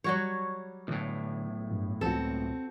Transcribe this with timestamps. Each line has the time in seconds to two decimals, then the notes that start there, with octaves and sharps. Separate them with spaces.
0.04 F#3 G3 F#4 C#5
0.88 B1 A2 D3
1.71 G2
2.01 C#2 C4 F#4 A4